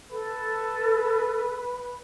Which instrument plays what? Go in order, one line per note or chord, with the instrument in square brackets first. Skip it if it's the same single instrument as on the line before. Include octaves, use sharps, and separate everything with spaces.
[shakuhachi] A4 [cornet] B4